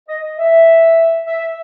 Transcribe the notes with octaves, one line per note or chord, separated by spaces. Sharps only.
D#5
E5
E5